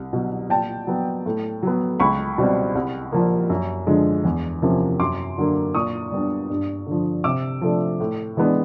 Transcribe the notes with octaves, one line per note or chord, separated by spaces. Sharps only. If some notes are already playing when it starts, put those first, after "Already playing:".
Already playing: C2
B2 F#3
A#2 G5 A5
F#3 B3
A2
F#3 B3
C#2 B5 C#6
B2 G3 C4
C2
A#2 F3 A#3
F#2
D3 F3 G#3
E2
C3 F3 A#3 C#4
F#2 C6 D6
D3 F#3 A#3
A#2 C#6 D#6
G3 B3 D4
G2
D3 F3
C3 D6 E6
F3 A3 D4
A2
E3 G#3 B3 D4